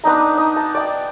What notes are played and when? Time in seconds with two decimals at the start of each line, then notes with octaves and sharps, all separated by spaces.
0.04 B3 D4 D#4 A#5
0.38 D#4
0.56 A5
0.75 D5 G5